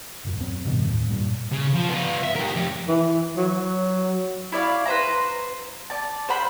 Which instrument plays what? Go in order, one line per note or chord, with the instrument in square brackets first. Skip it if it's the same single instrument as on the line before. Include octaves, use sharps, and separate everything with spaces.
[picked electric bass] D#1 F#2
F#3 B3 C4
E2 G2 B2 D#3
D#2 A2
G2 A#2
[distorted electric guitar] C#3
F3
B3 F4
E5
G4 A#4
F2 G4
[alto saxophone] E3
F#3
[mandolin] E4 C#5 D5 F5
B4 C5 A#5
D5 A5
C5 F5 F#5 B5